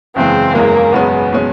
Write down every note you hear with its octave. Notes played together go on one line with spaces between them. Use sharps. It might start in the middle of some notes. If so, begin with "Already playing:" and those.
F#1 E2 C#3 E3 G#3 C4
F#1 E2 C#3 E3 G#3 A#3
F#1 E2 B2 G#3 B3 C#4
B2 G#3 C#4